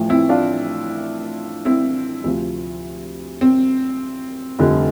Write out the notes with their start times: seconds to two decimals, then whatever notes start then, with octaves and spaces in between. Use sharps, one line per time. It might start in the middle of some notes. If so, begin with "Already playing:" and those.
Already playing: A1 A2 F3
0.09 C4 E4
0.29 D4 F4
1.65 C4 E4
2.24 D2 C3 F3
3.41 C4
4.59 F1 F2 D3 G3